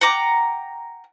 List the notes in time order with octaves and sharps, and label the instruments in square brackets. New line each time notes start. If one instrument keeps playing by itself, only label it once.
[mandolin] F#5 G5 A#5 D6